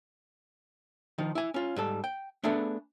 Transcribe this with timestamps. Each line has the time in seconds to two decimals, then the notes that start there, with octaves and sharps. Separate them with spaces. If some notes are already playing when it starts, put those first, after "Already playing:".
1.18 D#3 F3 D#4
1.35 E4 G#5
1.54 C#4 F4
1.76 G#2 G3 A4
2.04 G5
2.44 A3 B3 D4 G#4 A4 B4